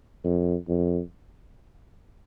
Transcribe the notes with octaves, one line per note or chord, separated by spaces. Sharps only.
F2
F2